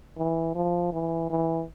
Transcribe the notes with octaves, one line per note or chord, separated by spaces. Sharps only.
E3
F3
E3
E3